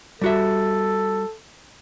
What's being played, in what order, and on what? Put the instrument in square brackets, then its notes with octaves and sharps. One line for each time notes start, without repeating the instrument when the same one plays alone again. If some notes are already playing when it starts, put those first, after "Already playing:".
[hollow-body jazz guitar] G3 F#4 E5 [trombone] A4